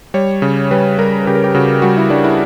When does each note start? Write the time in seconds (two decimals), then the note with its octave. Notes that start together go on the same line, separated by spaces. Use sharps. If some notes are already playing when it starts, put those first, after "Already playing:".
0.14 G3 C#5
0.42 C#3
0.71 G3 B4
0.98 G3 A#4
1.27 C#3 G4
1.35 A#4
1.44 G4
1.55 C#3 F#4
1.82 G3 F#4
1.97 E4
2.10 G3 D4
2.24 E4